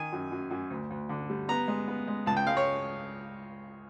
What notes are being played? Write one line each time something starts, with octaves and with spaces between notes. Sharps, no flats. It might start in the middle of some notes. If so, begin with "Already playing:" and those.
Already playing: D#3 G#5
F#2
F#2
F#2
D2
D2
D3
G3
B3 A#5
G#3
B3
G#3
C#2 A5
G5
G#3 F5
C#5